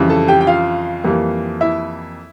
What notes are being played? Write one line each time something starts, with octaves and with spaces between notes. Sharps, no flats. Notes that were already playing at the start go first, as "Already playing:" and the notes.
Already playing: F2 C#3 E3 G3
A4 A5
G4 G5
G5
F4 F5
F2 E3 G3 A#3
E4 E5